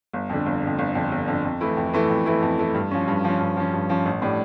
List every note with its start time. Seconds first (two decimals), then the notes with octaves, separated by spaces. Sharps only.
0.13 G1
0.29 F2 D3
0.46 G1
0.63 F2 D3
0.79 G1
0.95 F2 D3
1.12 G1
1.28 F2 D3
1.44 F2
1.61 E3 A3 E4
1.77 F2
1.93 E3 A3 E4
2.10 F2
2.26 E3 A3 E4
2.42 F2
2.58 E3 A3 E4
2.75 G2
2.91 F3 C#4
3.08 G2
3.24 F3 C#4
3.40 G2
3.57 F3 C#4
3.73 G2
3.89 F3 C#4
4.06 A1
4.22 A2 G3 D4